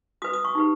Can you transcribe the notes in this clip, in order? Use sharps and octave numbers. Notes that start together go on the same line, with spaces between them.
F#4 B4 D#6
D#6
C#6
D#4 G4 B4